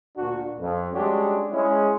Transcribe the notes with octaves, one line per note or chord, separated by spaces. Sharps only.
D2 A#2 D4 F#4
F2
G3 G#3 C#4 D4 F#4 G4
G#3 C#4 E4